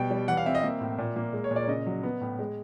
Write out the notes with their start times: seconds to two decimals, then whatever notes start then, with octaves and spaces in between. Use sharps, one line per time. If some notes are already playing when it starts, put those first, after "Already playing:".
Already playing: B2 G3 G5
0.11 G3
0.28 E3 F#5
0.37 F5
0.46 C4 E5
0.55 D#5
0.63 A#3 E5
0.81 A2
0.98 A#2
1.16 A#3
1.33 G#3
1.44 C#5
1.51 A#2
1.56 D5
1.68 C#3 D#5
1.87 F#3
2.03 B3
2.21 A2
2.39 G#3